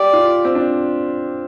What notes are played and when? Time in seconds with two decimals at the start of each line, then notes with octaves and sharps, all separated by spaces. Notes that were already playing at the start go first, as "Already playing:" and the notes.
Already playing: G4 D5
0.13 F4
0.45 C4
0.55 D4